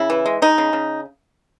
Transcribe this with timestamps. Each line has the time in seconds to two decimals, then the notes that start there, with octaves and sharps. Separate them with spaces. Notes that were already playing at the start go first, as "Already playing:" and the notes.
Already playing: C#3 E4
0.10 E3
0.26 G#3
0.42 G#3 D#4
0.58 C#3
0.73 C#3